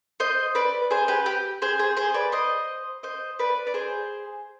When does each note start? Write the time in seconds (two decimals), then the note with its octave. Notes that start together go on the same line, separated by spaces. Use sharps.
0.20 C5 D#5
0.55 B4 D5
0.91 G#4 C5
1.08 G4 B4
1.26 G4
1.62 G#4 C5
1.79 G#4 C5
1.97 G#4 C5
2.14 B4 D5
2.32 C5 D#5
3.03 C5 D#5
3.39 B4 D5
3.67 D5
3.74 G#4 C5